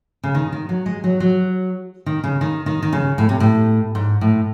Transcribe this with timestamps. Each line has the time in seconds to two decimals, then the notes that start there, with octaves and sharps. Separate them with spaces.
0.23 C#3
0.35 D#3
0.53 D#3
0.69 F#3
0.86 G#3
1.04 F#3
1.20 F#3
2.06 D#3
2.24 C#3
2.41 D#3
2.66 D#3
2.82 D#3
2.93 C#3
3.18 A2
3.29 C3
3.40 A2
3.95 G#2
4.21 A2